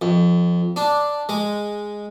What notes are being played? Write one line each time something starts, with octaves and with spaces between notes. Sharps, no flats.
F2
D4
G#3